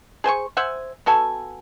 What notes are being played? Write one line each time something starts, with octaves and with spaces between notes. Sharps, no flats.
G#4 C5 G#5 C#6
C5 E5 F#5 G#5
B3 F#4 A4 G#5